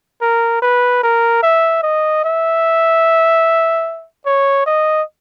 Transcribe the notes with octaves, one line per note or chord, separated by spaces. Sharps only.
A#4
B4
A#4
E5
D#5
E5
C#5
D#5